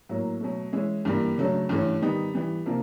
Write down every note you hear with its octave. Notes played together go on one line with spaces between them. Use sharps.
A2 F#3 A#3
B2 F#3 A3
E3 G#3 C#4 E4
G2 E3 G3 A#3
C#3 F#3 A3 D4
G2 E3 A3 C#4
D#3 G3 B3 D#4
E3 G3 B3
C3 F3 A#3 D4 F4